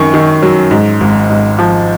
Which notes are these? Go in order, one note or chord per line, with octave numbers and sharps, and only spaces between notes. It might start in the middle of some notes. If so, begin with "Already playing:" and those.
Already playing: F#2 D#3 C#6
D#3
F#3
G#2
G#1
G#2
F3